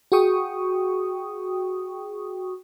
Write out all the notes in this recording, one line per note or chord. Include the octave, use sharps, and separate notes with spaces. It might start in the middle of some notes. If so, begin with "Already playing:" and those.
F#4 G#4 G5 C#6 D#6